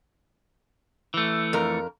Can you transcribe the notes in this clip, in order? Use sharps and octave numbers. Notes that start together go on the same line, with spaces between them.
E3 A3
F2 A#4